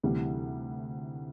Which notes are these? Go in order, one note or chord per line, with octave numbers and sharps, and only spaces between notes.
D2 C3 E3 G3